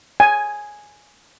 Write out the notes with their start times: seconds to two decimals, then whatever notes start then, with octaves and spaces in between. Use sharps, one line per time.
0.20 G#5